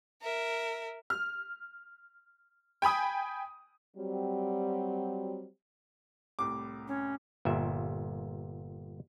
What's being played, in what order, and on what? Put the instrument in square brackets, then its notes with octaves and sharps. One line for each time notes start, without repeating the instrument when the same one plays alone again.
[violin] A#4 E5
[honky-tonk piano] F6
G5 G#5 B5 D#6
[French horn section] F#3 G3 C4
[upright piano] C2 A2 [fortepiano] D6
[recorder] C#4
[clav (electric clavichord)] G1 A#2 E5